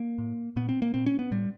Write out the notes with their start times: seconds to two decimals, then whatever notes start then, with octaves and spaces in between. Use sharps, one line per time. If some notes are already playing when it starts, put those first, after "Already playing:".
Already playing: A#3
0.18 A2
0.56 A#2 B3
0.69 C4
0.82 A#3
0.94 A#2 C4
1.06 C#4
1.19 B3
1.31 A2 G3